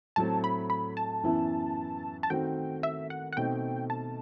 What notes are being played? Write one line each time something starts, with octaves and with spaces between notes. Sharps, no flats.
A2 F#3 A3 C4 A5
B5
B5
A5
F#2 E3 B3 E4
A5
D#3 A3 C4 F#4 G5
E5
F#5
F#5
B2 A3 C4 D#4 G5
A5